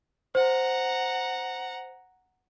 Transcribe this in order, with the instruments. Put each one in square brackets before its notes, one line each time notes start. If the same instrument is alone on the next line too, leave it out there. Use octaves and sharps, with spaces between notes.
[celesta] C5 [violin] F#5 A#5